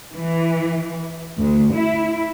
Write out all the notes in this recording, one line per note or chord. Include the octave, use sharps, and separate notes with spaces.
E3
D2
E4